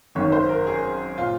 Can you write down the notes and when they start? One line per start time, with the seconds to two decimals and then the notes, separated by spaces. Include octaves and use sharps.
0.15 G#1 F#2 D#3 C#5
0.32 C5
0.49 A#4
0.67 G#4
1.18 A#2 F4